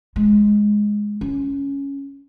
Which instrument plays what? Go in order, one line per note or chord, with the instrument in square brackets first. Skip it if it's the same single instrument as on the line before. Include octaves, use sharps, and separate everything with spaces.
[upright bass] G#3
C#4